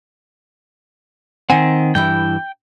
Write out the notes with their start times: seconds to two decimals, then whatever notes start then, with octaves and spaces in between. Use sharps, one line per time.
1.50 D#3 C4 F#5 G#5
1.95 G2 E3 E4 G5